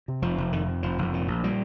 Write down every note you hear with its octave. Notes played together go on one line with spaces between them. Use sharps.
C3
F1 F3
F1
F2 D#3
C3
F1 F3
F1
A#2
A#1
A#2 G3